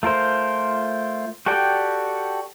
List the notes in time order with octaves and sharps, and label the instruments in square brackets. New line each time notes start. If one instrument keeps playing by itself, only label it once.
[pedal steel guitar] A3 F4 A#4 C5
F#4 G4 A4 D5 G5